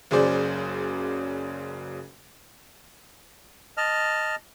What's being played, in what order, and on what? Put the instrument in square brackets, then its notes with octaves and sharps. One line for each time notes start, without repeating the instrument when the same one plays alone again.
[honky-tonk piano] F#1 C#3 F#3 G#4 C5 D5
[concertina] D#5 A5 F6